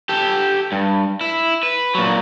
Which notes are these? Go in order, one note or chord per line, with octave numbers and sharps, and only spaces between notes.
G4 A4
G2
E4
B4
A#2 F#3